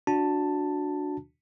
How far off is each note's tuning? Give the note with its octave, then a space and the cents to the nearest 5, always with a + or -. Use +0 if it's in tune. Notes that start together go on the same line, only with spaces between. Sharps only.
D4 -5 F#4 -20 A5 +5